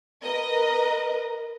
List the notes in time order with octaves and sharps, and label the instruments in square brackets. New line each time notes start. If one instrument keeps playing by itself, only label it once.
[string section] A#4 B4 D#5